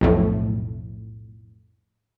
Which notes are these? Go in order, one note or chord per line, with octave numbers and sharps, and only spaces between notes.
B1 F2 A2